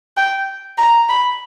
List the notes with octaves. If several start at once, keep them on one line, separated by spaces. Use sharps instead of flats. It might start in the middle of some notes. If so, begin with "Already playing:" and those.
G5
A#5
B5